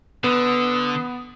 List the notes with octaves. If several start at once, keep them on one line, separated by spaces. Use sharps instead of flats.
D3 B3 D#6